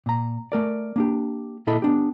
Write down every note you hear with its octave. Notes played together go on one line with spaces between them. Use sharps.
A#2 A#5
A3 A#4 D5
A#3 D4 G4
A#2 E4 A4 D#5 B5
B3 D4 G4